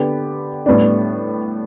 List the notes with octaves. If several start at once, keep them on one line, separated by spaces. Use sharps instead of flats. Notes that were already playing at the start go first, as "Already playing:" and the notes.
Already playing: D3 B3 G4
A2 G3 B3 D4